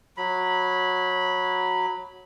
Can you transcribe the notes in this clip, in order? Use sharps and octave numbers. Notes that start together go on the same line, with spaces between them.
F#3 B5